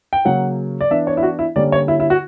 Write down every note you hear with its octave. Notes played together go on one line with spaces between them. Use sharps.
G5
C#3 F#3 A#3 C#4 F#5
D5
E3 B3 D4 E5
C#5
E4
F#4
E4
D3 G3 A#3 C#4 D5
C#5
E4
E4
F#4